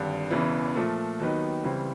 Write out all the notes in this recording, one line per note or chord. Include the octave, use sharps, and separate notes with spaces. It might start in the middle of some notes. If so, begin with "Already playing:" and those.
Already playing: G#1 G2 D3
E1 E2 C#3 E3
A#2 F3 A3
D#2 D#3 F#3 B3 D#4
C#2 C#3 E3 G3 C4